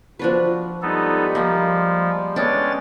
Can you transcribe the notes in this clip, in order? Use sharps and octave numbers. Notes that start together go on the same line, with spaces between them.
F3 D4 F#4 B4
G3 G#3 B3 D#4 A4
F3 A#3
G#3 B3 C#4 D4 C#5 G5 A6